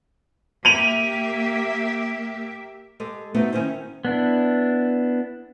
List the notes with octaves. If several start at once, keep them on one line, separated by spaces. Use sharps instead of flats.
A#3 G4 E5 D#7 F7
G#3 G4 A4
A3 B3 C4 D#4 F#4
D#3 C#4 E4 C5
B3 D4 E4